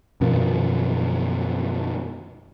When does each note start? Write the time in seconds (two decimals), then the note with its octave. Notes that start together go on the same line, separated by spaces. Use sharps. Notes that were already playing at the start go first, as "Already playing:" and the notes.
0.21 F#2 B2 D#3 F3